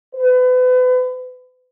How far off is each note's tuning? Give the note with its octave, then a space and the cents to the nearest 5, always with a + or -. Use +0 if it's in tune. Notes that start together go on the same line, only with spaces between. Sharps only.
B4 +35